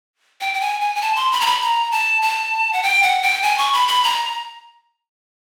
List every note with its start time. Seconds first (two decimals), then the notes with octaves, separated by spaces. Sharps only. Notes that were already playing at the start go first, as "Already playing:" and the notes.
0.41 G5
0.54 G5
0.61 G#5
0.81 G#5
0.95 G#5
1.02 A5
1.16 C6
1.32 B5
1.40 A#5
1.47 B5
1.61 A#5
1.92 A5
2.22 A5
2.73 F#5
2.83 G5
3.03 F#5
3.22 G5
3.42 G#5
3.58 C#6
3.73 B5
3.88 B5
4.04 A#5